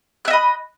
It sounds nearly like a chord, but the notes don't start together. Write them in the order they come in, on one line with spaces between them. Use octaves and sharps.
F#6 E5 D#5 B5